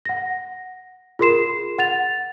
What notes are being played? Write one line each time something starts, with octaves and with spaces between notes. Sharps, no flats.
F#5 A#6
F4 G#4 A#4 C6 C7 E7
F#5 A6 F7